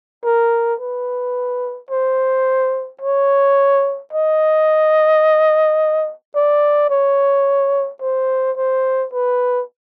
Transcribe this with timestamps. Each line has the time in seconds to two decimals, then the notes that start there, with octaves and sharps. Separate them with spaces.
0.24 A#4
0.80 B4
1.90 C5
3.01 C#5
4.13 D#5
6.35 D5
6.90 C#5
8.01 C5
8.57 C5
9.12 B4